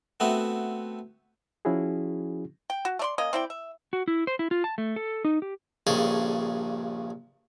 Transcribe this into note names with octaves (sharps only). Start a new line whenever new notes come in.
A3 B3 C4 F#4 E5
F3 C#4 E4 F#4 G#4
G5
F#4
A3 D5 C6
A#3 C#4 D#5
C4 E4 D5 G5
E5
F#4
E4
C5
E4
F4
A5
A3
A4
D#4
G4
A#1 G2 C#3 G#4 A4